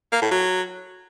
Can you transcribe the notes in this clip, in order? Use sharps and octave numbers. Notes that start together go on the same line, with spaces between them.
A#3
A2
F#3